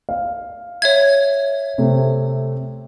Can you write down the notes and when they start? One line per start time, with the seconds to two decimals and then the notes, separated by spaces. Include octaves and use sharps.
0.09 F5
0.82 C#5 E5 G#6
1.78 C3 A3 C4